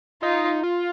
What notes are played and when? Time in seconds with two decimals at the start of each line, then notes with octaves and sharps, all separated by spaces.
0.22 D#4 F4
0.63 F4